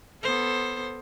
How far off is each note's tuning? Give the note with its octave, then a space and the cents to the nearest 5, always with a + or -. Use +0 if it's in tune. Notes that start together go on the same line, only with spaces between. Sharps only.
B3 +0 A4 +0 C5 +15